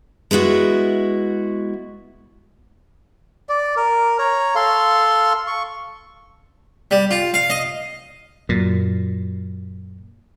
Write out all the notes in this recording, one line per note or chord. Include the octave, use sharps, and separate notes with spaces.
G#3 B3 E4 F#4
D5
A#4
C#5 A#5
A4 F5 C6
C#6
G3
F4
F5
D#5
F#2 A#2